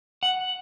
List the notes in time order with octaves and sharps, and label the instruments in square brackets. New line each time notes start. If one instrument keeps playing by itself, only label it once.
[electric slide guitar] F#5